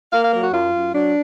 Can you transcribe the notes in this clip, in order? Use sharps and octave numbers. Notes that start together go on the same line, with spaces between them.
A#3 F5
F5
F#3 A#4
F#4
F#2 F4
F#2
F#3 D4